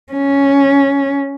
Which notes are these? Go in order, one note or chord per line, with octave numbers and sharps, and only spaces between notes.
C#4